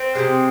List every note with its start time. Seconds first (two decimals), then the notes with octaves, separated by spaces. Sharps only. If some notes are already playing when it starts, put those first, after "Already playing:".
Already playing: C4
0.15 C3 F3 G#3